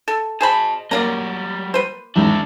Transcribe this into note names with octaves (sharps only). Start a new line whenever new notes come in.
A4
G#4 C5 D#5 A5 B5
F#3 G3 A#3 D5 F5 A#5
B4 C5
E2 G#2 D#3 D4 E5